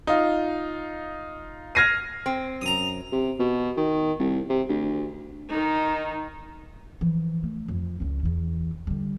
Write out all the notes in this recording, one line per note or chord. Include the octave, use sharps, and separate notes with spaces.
D#4 F4
F6 G#6 A#6 C7 D#7
C4
F#2 A#5 D#6
C3
B2
D#3
C2
C3
D2
D#3 D#4
E3 F3
A3
F2
C#2 C#4
E2 E3
D3 G3